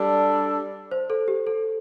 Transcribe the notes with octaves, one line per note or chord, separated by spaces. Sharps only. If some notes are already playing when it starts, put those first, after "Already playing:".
Already playing: G3 D4 A4 D5
C5
A4
G4
A4